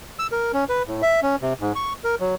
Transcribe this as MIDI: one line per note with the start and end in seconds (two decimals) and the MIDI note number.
0.19 0.27 88
0.32 0.52 70
0.53 0.64 61
0.69 0.83 71
0.87 1.02 45
1.02 1.20 76
1.23 1.36 61
1.42 1.54 48
1.61 1.73 44
1.75 1.93 85
2.04 2.15 70
2.20 2.35 54